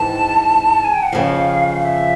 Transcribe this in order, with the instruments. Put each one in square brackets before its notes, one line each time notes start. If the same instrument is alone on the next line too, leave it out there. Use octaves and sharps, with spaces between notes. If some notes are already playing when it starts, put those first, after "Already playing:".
Already playing: [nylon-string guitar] G#2 E3 G#3 C4 [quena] A5
[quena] G#5
G5
F#5
[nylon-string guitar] F2 C#3 F3 [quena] F5
[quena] E5